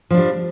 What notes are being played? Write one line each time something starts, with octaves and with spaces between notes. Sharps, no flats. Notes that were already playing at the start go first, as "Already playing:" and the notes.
F3 G3 D4